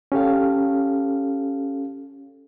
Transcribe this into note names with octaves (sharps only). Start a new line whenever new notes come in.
C#4 G4 A4 F5